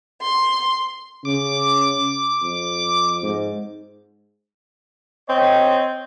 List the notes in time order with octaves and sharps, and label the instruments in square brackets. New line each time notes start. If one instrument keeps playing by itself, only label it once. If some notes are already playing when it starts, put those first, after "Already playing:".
[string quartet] C6
[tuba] C#3 [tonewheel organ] D6
[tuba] F2
G#2
[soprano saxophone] C4 [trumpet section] C#5 D#5 G5